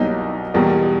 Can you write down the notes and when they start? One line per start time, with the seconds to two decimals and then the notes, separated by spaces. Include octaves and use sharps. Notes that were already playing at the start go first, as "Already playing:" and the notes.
Already playing: C2 B2 F#3 A#3 D#4
0.54 E2 B2 G3 A#3